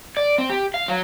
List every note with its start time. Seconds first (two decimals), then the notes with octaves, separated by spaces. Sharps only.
0.17 D5
0.38 C4
0.50 G4
0.74 F5
0.88 F#3